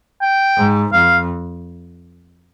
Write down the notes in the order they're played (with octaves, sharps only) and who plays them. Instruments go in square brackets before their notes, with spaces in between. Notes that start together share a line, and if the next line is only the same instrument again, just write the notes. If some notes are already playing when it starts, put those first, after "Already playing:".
[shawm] G5
[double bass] G#2
[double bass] F2 [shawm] F5